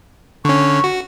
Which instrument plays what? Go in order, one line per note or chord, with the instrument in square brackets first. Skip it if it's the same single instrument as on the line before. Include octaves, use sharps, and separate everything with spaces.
[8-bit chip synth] D3 C#4 [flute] C#6
[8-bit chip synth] F#4